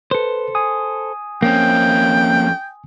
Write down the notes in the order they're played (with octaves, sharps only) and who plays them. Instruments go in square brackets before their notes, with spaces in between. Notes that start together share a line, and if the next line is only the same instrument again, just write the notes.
[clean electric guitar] A4 C5 [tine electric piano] B4
[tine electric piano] G#5 D#6
[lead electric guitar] F2 C#4 [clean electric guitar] A#3 C4 [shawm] G5